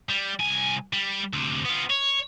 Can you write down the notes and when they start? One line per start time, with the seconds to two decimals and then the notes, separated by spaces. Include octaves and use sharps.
0.09 G3
0.40 C2 G#5
0.93 G3
1.33 D2 C3
1.65 B3 F4
1.90 C#5